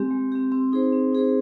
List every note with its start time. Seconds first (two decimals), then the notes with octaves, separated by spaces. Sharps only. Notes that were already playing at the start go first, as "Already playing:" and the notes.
Already playing: G#3 C4 G4
0.11 G#3
0.32 C4 G4
0.52 C4
0.72 D#4 G#4 C5
0.93 C4
1.13 D#4 G#4 C5